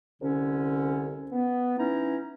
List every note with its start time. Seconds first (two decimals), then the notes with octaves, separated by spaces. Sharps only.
0.22 C2 D3 C#4
1.32 B3
1.78 E3 C#4 D#4 E4 A#5